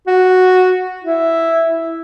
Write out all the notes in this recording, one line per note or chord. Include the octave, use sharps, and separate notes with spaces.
F#4
E4